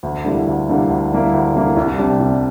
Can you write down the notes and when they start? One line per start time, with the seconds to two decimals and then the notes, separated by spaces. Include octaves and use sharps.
0.03 D2
0.25 D3 G3 A#3 E4
0.47 D2
0.69 D3 G3 A#3 E4
0.90 D2
1.12 D3 G3 A#3 E4
1.33 D2
1.55 D3 G3 A#3 E4
1.77 C2
1.99 C3 G3 D4 G4
2.20 C2